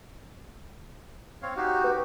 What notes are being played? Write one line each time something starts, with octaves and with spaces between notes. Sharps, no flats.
C4 C#5 F5
D#4 F#4 G4
B4